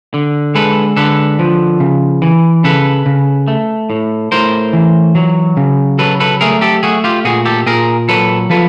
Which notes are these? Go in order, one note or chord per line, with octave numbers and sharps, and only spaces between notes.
D3
G#3 A4 B4
D3 A4 B4
F3
C#3
E3
C#3 A4 B4
C#3
A3
A2
A2 A#4 C5
E3
F#3
C#3
F#3 A4 B4
A4 B4
A3 G#4 A#4
G4 A4
A3 F#4 G#4
F4 G4
A#2 F#4 G#4
G4 A4
A#2 G#4 A#4
F#3 A4 B4
F3 A4 B4